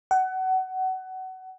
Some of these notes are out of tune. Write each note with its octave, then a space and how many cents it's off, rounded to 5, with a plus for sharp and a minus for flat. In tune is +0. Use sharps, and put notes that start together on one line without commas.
F#5 +25